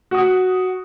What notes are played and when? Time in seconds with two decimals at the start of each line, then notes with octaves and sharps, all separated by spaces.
0.11 F#4 D#6